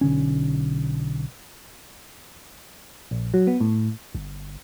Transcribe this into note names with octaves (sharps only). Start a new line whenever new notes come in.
B1 D3 C#4
A#1
F#3
B3
A2
G1